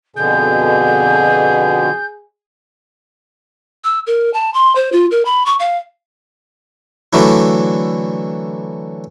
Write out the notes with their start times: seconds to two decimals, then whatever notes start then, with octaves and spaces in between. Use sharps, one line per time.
0.16 F2 B2 D3 G#4 G6
3.84 E6
4.07 A#4
4.34 A5
4.54 C6
4.76 C5
4.92 F4
5.11 A#4
5.25 B5
5.46 C#6
5.60 F5
7.13 D3 E3 F#3 A3 D4 E4